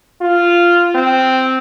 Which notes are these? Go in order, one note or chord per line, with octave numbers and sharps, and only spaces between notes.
F4
C4